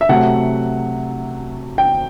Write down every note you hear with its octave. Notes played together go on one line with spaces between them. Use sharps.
E5
C3 F#3 A3 F#5
G5